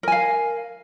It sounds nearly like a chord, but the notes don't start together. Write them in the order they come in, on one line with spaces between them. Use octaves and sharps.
A#4 G#5 F5